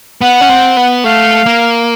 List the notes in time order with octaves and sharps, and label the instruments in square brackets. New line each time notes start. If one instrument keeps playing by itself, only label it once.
[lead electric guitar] B3 [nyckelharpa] F#5
[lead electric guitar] C#4
C4
B3
[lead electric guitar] A3 [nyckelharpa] F5
[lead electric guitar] A#3